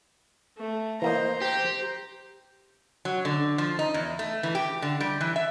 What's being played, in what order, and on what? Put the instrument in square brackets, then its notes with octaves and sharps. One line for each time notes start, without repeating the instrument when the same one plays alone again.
[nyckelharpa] A3
[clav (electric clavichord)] E3 A#3 D#5 [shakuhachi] C5 [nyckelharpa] A#5 C6
[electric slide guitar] G4 [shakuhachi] C5
[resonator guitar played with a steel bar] F#3
D3
F3
D#4
E2
A3
E3
G4
D3
G3
E3
E5